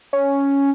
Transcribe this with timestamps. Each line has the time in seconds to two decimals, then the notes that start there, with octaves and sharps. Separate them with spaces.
0.13 C#4